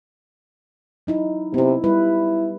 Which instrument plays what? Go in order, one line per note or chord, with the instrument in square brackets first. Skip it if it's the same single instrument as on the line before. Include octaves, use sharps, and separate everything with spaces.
[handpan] F#3 D#4 E4
[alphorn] C3 [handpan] B3 E4
[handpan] G3 B4 [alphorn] E4